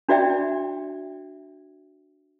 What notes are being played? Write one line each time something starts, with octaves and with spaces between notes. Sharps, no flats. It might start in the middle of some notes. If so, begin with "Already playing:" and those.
D4 F#4 D5 E5 G5